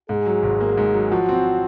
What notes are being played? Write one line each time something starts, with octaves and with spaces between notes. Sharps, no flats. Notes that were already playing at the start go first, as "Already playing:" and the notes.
G#2 G#4
F#3
G#1
A#3
G#2
F#3
F3 F#4
C4